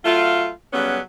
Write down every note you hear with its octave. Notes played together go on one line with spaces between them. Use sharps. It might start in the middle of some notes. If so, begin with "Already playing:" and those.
F#3 A3 F4
C#3 F#3 G3 B3 C#4